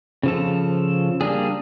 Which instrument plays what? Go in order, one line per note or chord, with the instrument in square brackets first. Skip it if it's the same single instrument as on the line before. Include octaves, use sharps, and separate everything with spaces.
[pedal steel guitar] C#3 F3 A4
G3 A#3 D4 G#4